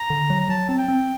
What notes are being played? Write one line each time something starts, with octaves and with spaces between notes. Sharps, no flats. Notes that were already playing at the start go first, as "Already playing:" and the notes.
Already playing: A#5
D3
F#3
A#5
F#3 A5
C4 A5
G5
C4